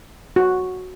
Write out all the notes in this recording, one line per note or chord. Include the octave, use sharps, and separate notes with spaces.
F#4